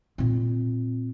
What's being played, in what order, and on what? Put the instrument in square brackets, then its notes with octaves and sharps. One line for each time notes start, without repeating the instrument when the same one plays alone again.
[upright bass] A#2 C4